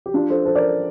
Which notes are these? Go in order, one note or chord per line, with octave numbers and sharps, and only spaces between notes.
G4
D4 F4
A4 C5
A4 C5
A#4 D5